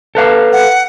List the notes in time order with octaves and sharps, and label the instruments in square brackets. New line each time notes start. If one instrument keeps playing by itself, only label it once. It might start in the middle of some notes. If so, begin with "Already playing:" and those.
[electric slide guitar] A4 B4 F5
[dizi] F#5